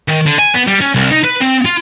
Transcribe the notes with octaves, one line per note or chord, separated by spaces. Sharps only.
D#3
D3
G#5
B3
G3
C#4
C2
D#4
B4
C4
F4